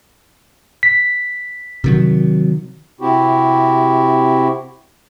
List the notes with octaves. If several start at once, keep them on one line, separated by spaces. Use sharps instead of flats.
B6
C3 D#3 F#3
C3 C4 E4 F#4 G4